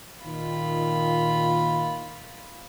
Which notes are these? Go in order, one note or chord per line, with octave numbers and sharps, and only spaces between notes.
A#2 D#3 F4 B5